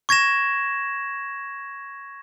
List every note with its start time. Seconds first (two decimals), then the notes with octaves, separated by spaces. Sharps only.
0.09 C#6 G#6 A#6 E7